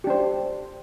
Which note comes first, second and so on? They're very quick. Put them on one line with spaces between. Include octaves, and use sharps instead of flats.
G4 D4 C5